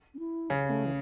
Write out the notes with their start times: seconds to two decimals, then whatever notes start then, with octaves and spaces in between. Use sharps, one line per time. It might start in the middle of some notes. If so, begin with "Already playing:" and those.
0.14 C#4
0.19 E4
0.50 C#3 C#4
0.70 A3
0.85 E3